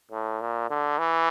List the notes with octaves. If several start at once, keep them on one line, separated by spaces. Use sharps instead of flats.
A2
A#2
D3
E3